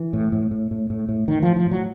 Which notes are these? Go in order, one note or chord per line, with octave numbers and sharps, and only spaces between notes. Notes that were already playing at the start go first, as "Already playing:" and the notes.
Already playing: E3
A2
A2
A2
A2
A2
A2
A2 D#3
A2 F3
F3
A2
F#3